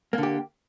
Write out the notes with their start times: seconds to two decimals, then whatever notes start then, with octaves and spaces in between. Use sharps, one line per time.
0.13 A#3
0.18 D3
0.23 G4